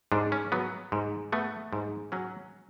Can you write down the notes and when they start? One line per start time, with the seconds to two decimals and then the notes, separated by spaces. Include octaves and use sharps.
0.12 G#2 D4
0.32 C#4
0.52 F#3 B3
0.92 G#2
1.32 A3 B3
1.73 G#2
2.12 F#3 C#4